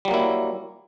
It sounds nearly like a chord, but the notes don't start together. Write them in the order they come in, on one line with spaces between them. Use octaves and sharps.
G3 F#3 A#3 E4